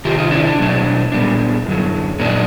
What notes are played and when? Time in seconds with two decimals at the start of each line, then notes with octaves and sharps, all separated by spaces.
0.05 C3 D#3 F4 G4
0.18 D#4 F4
0.31 D4 E4
0.46 D4
0.59 B2 F#3 A3 D4
1.12 A#2 G3 B3 D4
1.66 F#2 D3 F#3
2.20 A#2 F#3 A#3 D4 D#4